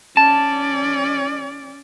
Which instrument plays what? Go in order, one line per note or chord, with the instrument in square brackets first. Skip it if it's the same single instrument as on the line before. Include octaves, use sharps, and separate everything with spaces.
[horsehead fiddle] C#4 D5 [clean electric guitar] A5